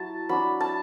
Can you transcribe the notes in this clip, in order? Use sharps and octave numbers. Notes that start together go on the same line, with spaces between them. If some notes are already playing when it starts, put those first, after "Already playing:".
Already playing: F#3 E4 A5
F#3 D4 B5
A5